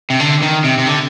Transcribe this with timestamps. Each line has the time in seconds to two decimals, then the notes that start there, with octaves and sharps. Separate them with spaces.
0.10 C3
0.20 D3
0.42 D#3
0.64 C3
0.78 C3
0.86 D3